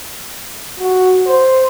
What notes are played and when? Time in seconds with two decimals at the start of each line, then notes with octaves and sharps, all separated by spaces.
0.80 F#4
1.27 C5